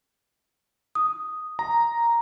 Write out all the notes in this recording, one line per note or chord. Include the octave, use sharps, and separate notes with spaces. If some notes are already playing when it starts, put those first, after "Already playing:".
D#6
A#5